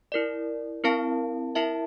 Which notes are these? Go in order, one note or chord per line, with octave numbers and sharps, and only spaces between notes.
E4 A#4 D5
C4 E4 A#4 F5 A5
E4 A#4 E5 A5